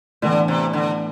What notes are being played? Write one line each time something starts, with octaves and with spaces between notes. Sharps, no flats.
A2 D3 E3 B3 D4
C3
D3